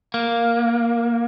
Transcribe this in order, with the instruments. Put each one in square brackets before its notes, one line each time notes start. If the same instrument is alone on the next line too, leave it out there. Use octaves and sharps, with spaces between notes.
[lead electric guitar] A#3